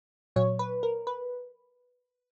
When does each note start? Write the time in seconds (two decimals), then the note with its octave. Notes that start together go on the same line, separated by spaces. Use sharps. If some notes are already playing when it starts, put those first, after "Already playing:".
0.36 A#2 F#3 C#5
0.59 B4
0.83 A#4
1.07 B4